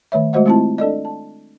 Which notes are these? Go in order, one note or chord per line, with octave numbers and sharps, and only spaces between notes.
D#3 A3 C#5 E5
G#3 A3 F#4 C5 D#5 F#5
G#3 A3 C4 E4 F4 A5
D4 A4 D5 D#5
A5